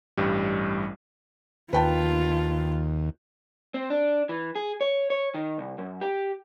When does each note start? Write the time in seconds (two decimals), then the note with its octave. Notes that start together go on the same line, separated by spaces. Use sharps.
0.17 A1 G2 G3
1.73 D#2 F4 B4 G5 A5
3.74 C4
3.90 D4
4.29 E3
4.55 G#4
4.81 C#5
5.10 C#5
5.34 D#3
5.58 C2
5.78 F#2
6.01 G4